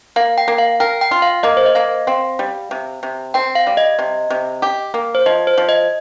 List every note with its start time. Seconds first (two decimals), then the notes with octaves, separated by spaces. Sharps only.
0.16 A#3 F5
0.38 G5
0.48 A#3
0.58 F5
0.80 A#4 G5
1.01 G5
1.11 F4
1.22 F5
1.43 A#3 D#5
1.57 C5
1.66 D#5
1.75 A#3 F5
2.07 C4 F5
2.39 G3
2.71 C3
3.03 C3
3.34 C4 G5
3.55 F5
3.67 G3
3.77 D#5
3.99 C3
4.30 C3
4.62 G4
4.94 A#3
5.15 C5
5.26 F3 D#5
5.47 C5
5.58 F3
5.69 D#5